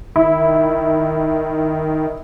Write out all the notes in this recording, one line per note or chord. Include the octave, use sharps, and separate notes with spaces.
D#3 E4